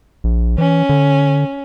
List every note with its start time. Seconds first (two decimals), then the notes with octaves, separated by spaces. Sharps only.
0.24 A#1
0.58 E3 C#4
0.89 D3